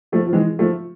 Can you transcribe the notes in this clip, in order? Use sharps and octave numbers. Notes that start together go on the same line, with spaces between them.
F3 A3
F3
E3 G#3
F3 A3